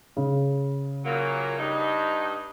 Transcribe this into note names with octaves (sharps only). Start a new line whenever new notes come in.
C#3
A#2 F#3 A#3
G2 D#4